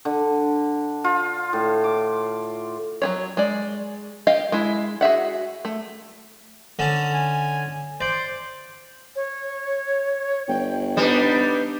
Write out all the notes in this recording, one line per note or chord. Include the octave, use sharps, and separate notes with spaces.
D3
F4
A2
D6
F#3 C#4 C#5
G#3 D5
G4 D#5 F5
G#3 E4
F#4 G#4 E5 F#5
A3
D3 C#4 A5
G#5
C5 D5
C#5
G1 G5
G3 B3 D4 D#4 B4